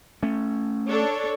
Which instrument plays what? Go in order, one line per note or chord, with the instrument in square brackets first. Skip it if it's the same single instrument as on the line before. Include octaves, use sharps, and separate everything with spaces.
[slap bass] A3 C#4
[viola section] D4 A4 C#5